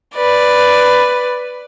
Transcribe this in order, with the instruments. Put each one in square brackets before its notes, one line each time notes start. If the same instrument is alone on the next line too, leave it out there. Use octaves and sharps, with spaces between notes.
[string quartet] B4 D5